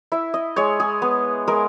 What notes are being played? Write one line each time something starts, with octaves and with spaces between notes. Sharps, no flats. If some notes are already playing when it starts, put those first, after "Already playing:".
E4 E5
D#5
G#3 C#5
G#4
B3
G#3 A#4